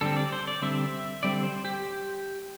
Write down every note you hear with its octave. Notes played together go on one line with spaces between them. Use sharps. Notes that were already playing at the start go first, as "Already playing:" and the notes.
D3 G3 C4 A4
D5
C5
D5
D3 G3 C4 E5
D3 G3 C4 D5
C5
G4